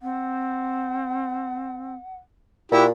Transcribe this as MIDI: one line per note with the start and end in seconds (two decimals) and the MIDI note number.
0.02 1.95 60
0.02 2.16 78
2.72 2.90 46
2.72 2.85 64
2.72 2.87 66
2.72 2.85 67